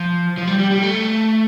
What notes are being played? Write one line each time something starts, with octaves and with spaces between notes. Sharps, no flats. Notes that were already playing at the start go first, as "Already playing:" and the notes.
Already playing: F3
F3
G3
G3
G3
A3